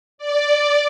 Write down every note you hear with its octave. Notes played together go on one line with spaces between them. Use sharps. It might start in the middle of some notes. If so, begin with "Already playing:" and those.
D5